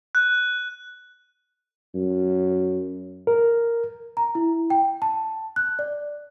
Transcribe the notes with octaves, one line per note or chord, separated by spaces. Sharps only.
F#6
F#2
A#4
A#5
E4
G5
A5
F#6
D5